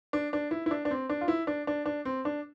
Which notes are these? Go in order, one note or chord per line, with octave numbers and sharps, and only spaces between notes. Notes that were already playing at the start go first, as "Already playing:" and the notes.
D4
D4
E4
E4
D4
D4
C4
D4
F4
E4
D4
D4
D4
C4
D4